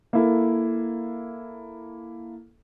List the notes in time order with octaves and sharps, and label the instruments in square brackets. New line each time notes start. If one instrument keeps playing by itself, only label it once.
[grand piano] A#3 E4 A4